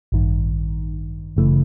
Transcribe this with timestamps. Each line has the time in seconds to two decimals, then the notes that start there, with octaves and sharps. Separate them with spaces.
0.12 A1 G2 D#3
1.36 G1 F#2 C#3 E3 A3